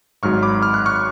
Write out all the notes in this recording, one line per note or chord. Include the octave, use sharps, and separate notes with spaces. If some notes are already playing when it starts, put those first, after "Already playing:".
G#1 G#2 F#3 C#6 F6
B5 D6
F6
F#6
C#6 F6